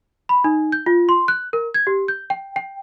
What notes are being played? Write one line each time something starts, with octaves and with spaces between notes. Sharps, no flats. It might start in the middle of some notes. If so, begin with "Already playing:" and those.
B5
D#4
G6
F4
C6
F#6
A#4
G#6
G4
G6
G5
G5